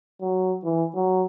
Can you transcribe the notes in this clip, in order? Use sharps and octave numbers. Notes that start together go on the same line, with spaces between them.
F#3
E3
F#3